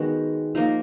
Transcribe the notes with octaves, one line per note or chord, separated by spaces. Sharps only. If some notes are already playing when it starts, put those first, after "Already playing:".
Already playing: D#3 G#3 B3 F#4
F3 A#3 D#4